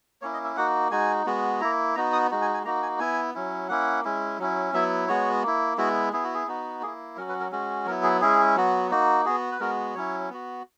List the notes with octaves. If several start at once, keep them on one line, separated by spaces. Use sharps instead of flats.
A#3 C#4 E4 C#5
D#5
E5
A#3 D#4 F#4 F#5
G#3 D#4 F#4 G#5
G#3 B3 F#4
A#3 E4 A#5
B3 D#4 F#4 A#5
D#6
G#3 D#4 F#4
G#5
G#5
A#3 D#4 F#4 A#5
G#5
B3 E4 G#5
F#3 C#4 E4
A#3 C#4 E4 F#5
G#3 C#4 E4
F#3 C#4 E4
F#3 B3 E4 E5
G#3 B3 F#4 C#5
A#3 E4
G#3 B3 E4 F#4
B3 E4 G#4
F#4
G#4
B3 D#4 F#4
A#3 E4 G#4
F#3 C#4 F#4 A#4
B4
A#4
G#3 C#4 F#4
F#3 B3 E4 A#4
G#4
G#3 C#4 E4 G#4
F#3 B3 F#4
A#3 D#4 F#4
B3 F#4 G#4
B4
G#3 B3 F#4 A#4
F#3 C#4 E4 C#5
B3 F#4